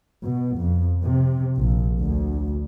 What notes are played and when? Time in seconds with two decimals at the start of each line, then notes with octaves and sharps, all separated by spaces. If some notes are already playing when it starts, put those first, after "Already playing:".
0.24 B2
0.58 F2
1.03 C3
1.58 A#1
2.00 D2